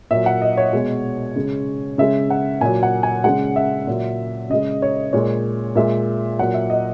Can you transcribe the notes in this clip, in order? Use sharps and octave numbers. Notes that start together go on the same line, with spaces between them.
A#2 F#3 E5
F#5
D#5
C#5
B2 G#3
C#3 G#3
C#3 G#3 E5
F#5
A#2 F#3 G#5
F#5
G#5
C#3 G#3 F#5
E5
A#2 F#3
C#3 G#3 D#5
C#5
A#2 G#3 C#5
A#2 G#3 E5
A#2 F#3 F#5
E5
D#5